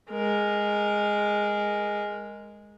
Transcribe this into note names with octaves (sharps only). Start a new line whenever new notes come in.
G#3 A#4